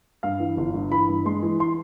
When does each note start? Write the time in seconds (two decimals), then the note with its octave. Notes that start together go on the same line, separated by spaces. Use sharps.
0.23 G2 F5
0.40 E3
0.57 G1
0.74 G2
0.91 E3 B5
1.09 G2
1.25 G#3 C6
1.43 E3
1.60 C6